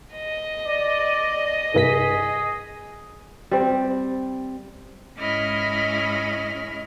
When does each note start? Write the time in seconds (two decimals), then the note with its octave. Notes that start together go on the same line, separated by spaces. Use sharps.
0.14 D#5
0.67 D5
1.74 C2 G2 G#4 B6
3.51 G3 C4
5.18 G#2 C#4 E4 D#5 B5 F6